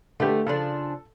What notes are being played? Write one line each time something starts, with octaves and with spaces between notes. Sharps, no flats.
D3 A3 G4 B4
C#3 F3 D4 A4